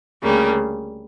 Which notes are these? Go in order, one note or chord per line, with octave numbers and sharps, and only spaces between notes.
D2 C#3 G3 A#3